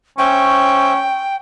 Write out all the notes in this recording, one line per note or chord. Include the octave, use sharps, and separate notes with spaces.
C#4 C5 E5 G5 C#6